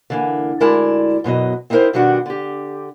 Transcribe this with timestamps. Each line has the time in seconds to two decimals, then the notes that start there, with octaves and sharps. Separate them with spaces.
0.10 D3 E3 A#3
0.60 D2 G#3 E4 A#4 D5 A5
1.24 F#2 B2 F#3 D#5
1.70 C4 D#4 E4 F#4 A#4 C5
1.93 B2 D#3 G3 D4 F#4 F#5
2.26 D3 G4